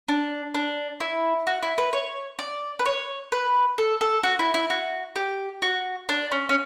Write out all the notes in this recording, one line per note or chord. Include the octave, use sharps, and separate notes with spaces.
D4
D4
E4
F#4
E4
B4
C#5
D5
B4
C#5
B4
A4
A4
F#4
E4
E4
F#4
G4
F#4
D4
C#4
C#4